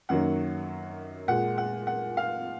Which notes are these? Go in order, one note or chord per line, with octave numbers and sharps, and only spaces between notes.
F#2 D#3 F#3 A#3 F#5
A#2 G#3 F#5
F#5
F#5
F5